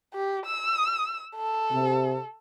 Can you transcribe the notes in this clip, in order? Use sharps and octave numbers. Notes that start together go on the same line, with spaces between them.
G4
E6
A4
C3